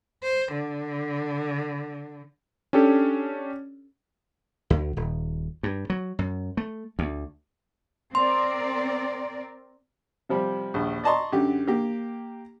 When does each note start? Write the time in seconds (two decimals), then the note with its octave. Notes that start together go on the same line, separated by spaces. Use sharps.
0.23 C5
0.52 D3
2.73 C#4 D4 G4 A4
4.70 D2
4.97 D#1
5.63 G2
5.90 F#3
6.19 F#2
6.57 A3
6.99 D2
8.15 C4 A#4 D5 C6
10.29 C3 F3 G3
10.74 A#1 D#2
11.04 D5 D#5 A5 A#5 C6 C#6
11.32 F#2 D3 G4
11.67 A#3 G4